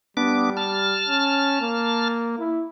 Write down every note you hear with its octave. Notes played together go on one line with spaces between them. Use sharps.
G3 B3 D4 D6
A5 F6
C#4
A#3
E4